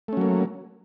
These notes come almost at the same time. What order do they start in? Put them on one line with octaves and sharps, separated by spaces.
A3 C#4 F#3 A#3